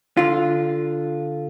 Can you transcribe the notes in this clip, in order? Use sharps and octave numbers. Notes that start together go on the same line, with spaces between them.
D3 F4